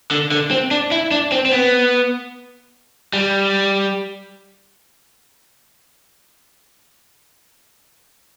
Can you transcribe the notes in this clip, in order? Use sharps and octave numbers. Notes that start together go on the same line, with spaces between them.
D3
D3
C4
D4
E4
D4
C4
C4
B3
G3